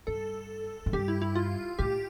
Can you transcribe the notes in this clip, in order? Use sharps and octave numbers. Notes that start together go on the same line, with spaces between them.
G2 A4
A2
G2 G4
E4
E4
F4
A2 G4